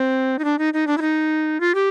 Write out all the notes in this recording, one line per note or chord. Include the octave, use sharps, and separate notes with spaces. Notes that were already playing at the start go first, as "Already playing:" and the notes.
Already playing: C4
D#4
D4
D#4
D#4
D4
E4
D#4
F4
G4